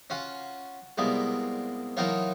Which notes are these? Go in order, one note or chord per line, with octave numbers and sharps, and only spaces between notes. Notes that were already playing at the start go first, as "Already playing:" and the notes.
C#4 F4 F#4
C2 B2 G#3 A#3 D5
E3 F#3 A#3 D#4 F4 C#5